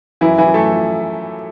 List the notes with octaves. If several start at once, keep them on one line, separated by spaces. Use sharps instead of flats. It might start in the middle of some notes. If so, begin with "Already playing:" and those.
F#2 E3 E4
E3 E4
F#2
A3 A4
F3